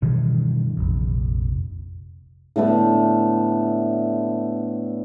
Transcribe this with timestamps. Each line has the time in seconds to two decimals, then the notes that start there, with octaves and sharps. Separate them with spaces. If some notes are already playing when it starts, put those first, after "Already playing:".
0.02 G2 B2 D#3 E3
0.77 F1 A#1
2.56 A2 D3 A3 B3